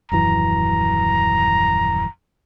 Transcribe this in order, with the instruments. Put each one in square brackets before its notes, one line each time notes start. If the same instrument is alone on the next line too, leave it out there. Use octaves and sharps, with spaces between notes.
[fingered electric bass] D#1 F#2 E3 [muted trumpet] A#5